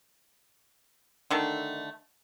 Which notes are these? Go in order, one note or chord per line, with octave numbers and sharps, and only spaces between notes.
D3 D#3 A3